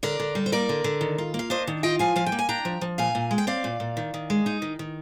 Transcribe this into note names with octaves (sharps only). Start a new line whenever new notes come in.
D3 A#4 D5
D3
G3
C5
A#3 A#4 D5
D3
D3
D#3
F4
A#3
F5
D4 C5 D#5
D#3
F4 D#5 G5
F3 F5 G#5
F3 F5
G5
A#3
G#5
D4 G5 A#5
F3
F3
A#2 F5 G#5
A#2
G#3
G5
C4 D5 F5
A#2
A#2
D#3
D#3
G#3
D#4
D#3
D#3